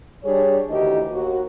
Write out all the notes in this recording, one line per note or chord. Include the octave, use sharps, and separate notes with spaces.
G3 D4 G#4 C#5
D2 A2 D#3 E3 G4 D#5
D#2 F#4